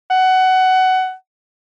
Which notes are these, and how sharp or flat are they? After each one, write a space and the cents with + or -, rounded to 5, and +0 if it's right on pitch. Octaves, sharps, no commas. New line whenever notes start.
F#5 +20